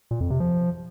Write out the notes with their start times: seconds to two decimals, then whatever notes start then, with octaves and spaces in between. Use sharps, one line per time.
0.11 A#2
0.21 F2
0.30 C3
0.40 F3